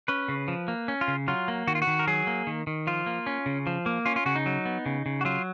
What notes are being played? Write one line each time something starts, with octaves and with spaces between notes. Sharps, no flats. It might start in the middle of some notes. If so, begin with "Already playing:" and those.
C#4 B4
C#3
F3
A#3
C#4
F4
C#3
F#3 F4
A#3
D#3 F#4
F4
F#4
D#3
A#4
F#3 G#4
A#3
D#3
D#3
F3 F4
A#3
C#4
C#3
F3
A#3
C#4 F4
F4
C#3 F#4
D#4
F#3
B3
C#3
C#3
F#4
F#3 F4